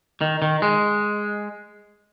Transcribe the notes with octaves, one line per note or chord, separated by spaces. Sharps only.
D#3
D#3
G#3